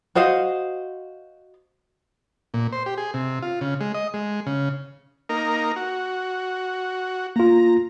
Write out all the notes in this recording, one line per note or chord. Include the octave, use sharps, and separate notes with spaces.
F#4 C5 D#5 F5
A#2
C5
G4
G#4
C3
F4
C#3
G#3
D#5
G#3
C#3
A#3 D#4 A#4
F#4
A#3 F4 A#5